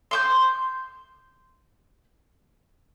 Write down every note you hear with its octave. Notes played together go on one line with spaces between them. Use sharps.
C6 D6 G6